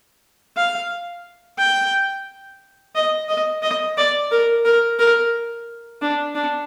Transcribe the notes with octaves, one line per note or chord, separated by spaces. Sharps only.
F5
G5
D#5
D#5
D#5
D5
A#4
A#4
A#4
D4
D4